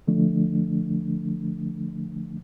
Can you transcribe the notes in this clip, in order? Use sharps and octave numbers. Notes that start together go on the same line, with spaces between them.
D3 F3 A3 D4